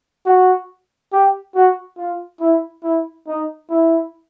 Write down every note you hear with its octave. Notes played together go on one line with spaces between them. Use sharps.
F#4
G4
F#4
F4
E4
E4
D#4
E4